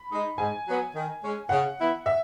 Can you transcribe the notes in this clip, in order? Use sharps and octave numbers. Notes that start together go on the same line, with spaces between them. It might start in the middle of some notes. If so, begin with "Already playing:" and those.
Already playing: B5
G#3 D#4
G#2 G#5
F#3 B3
D#3
G#3 C#4
C#3 F#5
E3 B3 E4
E5